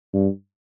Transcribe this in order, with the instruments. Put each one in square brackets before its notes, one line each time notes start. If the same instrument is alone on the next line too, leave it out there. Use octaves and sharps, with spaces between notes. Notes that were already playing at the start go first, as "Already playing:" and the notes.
[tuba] G2